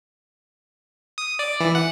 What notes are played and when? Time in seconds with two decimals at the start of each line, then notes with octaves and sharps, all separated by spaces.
1.18 D#6
1.39 D5
1.60 E3
1.75 F#5